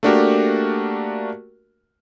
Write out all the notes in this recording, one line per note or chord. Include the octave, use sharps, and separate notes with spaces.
A3 A#3 D4 F#4 G4 A#4